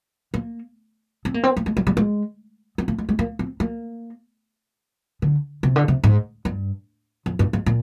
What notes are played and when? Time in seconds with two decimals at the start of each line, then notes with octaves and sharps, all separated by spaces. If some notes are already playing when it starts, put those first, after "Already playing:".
0.34 A#3
1.25 C4
1.34 A#3
1.43 C4
1.57 A#3
1.66 G#3
1.77 G3
1.87 G3
1.97 G#3
2.78 C4
2.88 A#3
2.98 G#3
3.09 G#3
3.19 A#3
3.39 C4
3.60 A#3
5.22 D3
5.63 C3
5.76 D3
5.88 C3
6.04 G#2
6.45 G2
7.26 F2
7.39 G2
7.53 G#2
7.66 A#2